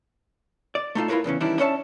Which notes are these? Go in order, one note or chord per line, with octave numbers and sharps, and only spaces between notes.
D5
A3 D#4 F4 A4
E4 F4 G#4 A#4 B4 C#5
E2 C#3 E3 C#4
D#3 E3 G3 C#4 D4 E4
C#4 D4 C#5 E5 A5